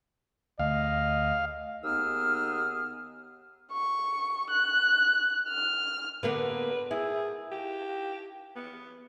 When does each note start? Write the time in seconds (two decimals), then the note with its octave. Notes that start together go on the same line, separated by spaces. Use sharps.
0.59 D2 A3 D#5 F5
1.83 D#2 B3 D#4 G#4 E6 F6
3.72 C#6
4.50 F#6
5.48 F6
6.23 D3 A#3 B3 B4
6.91 E4 G#4
7.52 G4
8.56 B3